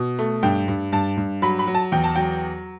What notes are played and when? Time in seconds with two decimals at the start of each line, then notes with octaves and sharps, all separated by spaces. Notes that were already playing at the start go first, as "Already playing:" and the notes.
Already playing: B2
0.19 A3
0.43 G2 G5
0.68 G2
0.92 G2 A5
1.17 G2
1.42 F#3 B5
1.59 B5
1.67 F#3
1.75 A5
1.92 E2 G5
2.04 A5
2.16 F#3 G5